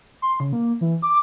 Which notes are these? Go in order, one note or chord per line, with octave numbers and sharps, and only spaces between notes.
C6
C#3
A#3
E3
D6